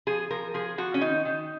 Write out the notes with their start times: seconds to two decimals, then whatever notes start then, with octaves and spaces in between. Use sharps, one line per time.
0.07 F3 G#4
0.30 F3 A#4
0.54 F3 G#4
0.78 F3 F#4
0.94 C#4
1.01 D#3 D#4
1.25 D#3